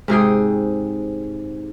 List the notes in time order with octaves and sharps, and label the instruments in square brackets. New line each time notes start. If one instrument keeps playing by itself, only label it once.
[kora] G#2 C3 G#4 G5